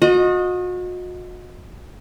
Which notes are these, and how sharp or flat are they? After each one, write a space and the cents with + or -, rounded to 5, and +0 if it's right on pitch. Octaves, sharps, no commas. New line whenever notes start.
F#4 -40 D#5 +0